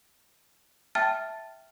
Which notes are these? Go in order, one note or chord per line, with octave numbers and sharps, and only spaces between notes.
E5 G5 A5 F6 A6